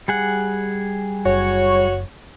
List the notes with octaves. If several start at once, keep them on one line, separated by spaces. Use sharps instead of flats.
G3 G#4 F#5
F#1 F#4 C#5